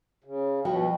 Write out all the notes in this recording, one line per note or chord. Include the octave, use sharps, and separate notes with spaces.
C#3
G2 B2 F3 F#4 G5 B5